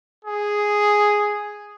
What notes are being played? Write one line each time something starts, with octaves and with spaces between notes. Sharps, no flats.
G#4